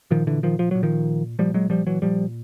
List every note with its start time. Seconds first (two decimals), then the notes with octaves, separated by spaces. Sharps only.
0.11 A#2 D#3 F3
0.27 D3 E3
0.43 D#3 F3
0.59 F3
0.71 A#2 F#3
0.83 D#3 F3
1.39 A#2 F3 G3
1.54 F#3 G#3
1.70 F3 G3
1.87 E3 F#3
2.02 A#2 F3 G3